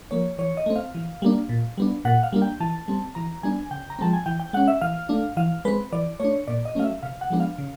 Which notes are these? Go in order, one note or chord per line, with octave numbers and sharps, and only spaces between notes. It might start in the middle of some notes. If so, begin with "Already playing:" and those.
F3 A#3 C#5
E3 C#5
D#5
A3 C4
F5
E3
G3 A#3 D4
A#2
G3 B3 D4
A#2 F#5
F5
G3 A#3 D4
G5
E3 A5
G3 C4
E3 A#5
G3 B3 D4 G#5
C#3 G5
A#5
F3 G#3 C4 A5
G#5
E3 G5
G5
G#3 C#4 F#5
E5
E3 F5
A3 D4
E3 F5
G#3 C4 B4
E3 D5
A3 D4 C#5
A#2 D5
D#5
F#3 A3 C#4 F5
E5
C3 F5
F#5
F3 G#3 B3 D4
F5
C#3